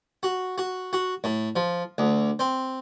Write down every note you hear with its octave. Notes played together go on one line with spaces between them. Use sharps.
F#4
F#4
F#4
A2
F3
D2
C4